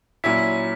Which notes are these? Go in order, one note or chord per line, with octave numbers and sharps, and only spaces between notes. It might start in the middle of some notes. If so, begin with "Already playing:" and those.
A#2 F#3 C#4 E4 B6